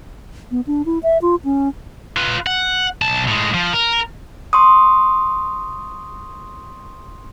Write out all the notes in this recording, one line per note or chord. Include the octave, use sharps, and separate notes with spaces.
B3
D4
E4
E5
F4
C#4
F4 B4
F#5
B1 A5
A2 G#3
F3
A#4
C6 C#6 D#6